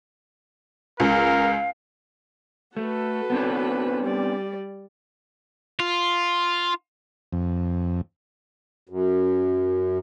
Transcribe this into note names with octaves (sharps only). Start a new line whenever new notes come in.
C#2 A#4 F5
A3 F#4 A4 B4
B3 C4 D4
G3 D5
F4
F2
F#2